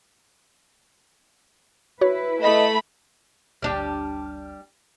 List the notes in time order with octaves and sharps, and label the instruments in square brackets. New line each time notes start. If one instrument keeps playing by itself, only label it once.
[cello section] E4 B4 [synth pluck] F#4 C#5
[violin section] A3 B5 [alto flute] D#5
[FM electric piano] G#1 D2 F6 [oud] G3 D4 G4